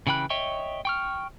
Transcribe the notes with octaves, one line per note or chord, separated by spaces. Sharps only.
C#3 E3 G5 B5 F#6
C#5 D#5 E5 G5 C#6
G5 C#6 F6